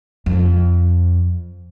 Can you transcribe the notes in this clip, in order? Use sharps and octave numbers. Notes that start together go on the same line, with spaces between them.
F2